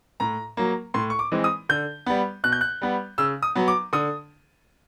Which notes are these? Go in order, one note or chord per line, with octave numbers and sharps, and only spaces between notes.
A2 A#5
F#3 A#3
A2 C6
C#6
D6
E3 G#3 C4
D#6
D3 G6
G3 B3
B2 F#6
G6
F#6
G3 B3
C#3 E6
D#6
F#3 B3
D6
D3 D#6